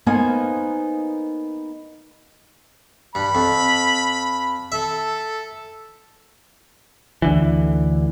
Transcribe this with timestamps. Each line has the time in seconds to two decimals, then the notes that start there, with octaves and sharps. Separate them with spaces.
0.06 A#3 B3 D#4 C5 F5 G#5
3.15 G2 B5
3.35 F2
4.72 A4 E5
7.22 D2 D3 E3